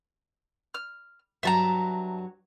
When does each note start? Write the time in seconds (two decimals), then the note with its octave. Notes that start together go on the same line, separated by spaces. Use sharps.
0.74 F6
1.43 G2 F#3 E5 A5 A#5